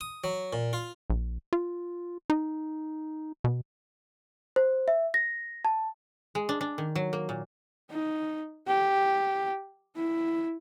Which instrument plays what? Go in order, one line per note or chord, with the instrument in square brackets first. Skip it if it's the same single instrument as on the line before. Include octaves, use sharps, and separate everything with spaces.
[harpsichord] D#6
F#3
A#2
F4
[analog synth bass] A#1
F4
D#4
B2
[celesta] C5
E5
A#6
A5
[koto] G#3
D4
D4
D#3
F#3
A#3
A#2
[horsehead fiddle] D#4
G4
E4